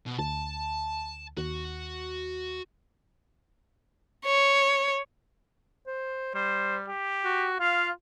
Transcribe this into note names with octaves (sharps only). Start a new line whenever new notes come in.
B2
D2 A5
D#2 F#4
C#5
C5
G3 C5
G4
F#4
F4 F5